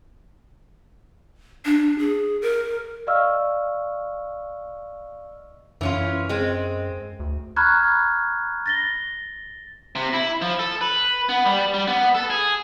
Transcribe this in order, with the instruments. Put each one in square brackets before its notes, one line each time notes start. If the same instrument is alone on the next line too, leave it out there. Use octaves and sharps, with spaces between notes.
[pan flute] D4
G#4
A#4
[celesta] D5 D#5 F5 C#6 E6 F6
[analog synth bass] F#2 [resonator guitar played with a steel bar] E3 C#4 F4
[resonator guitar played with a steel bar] G#3 C4
[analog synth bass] D2
[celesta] A#5 B5 C#6 F6 F#6 G#6
A6 A#6 G7
[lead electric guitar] C3
E4
F3
A4
B4
B3
G3
G3
B3
A4
G#4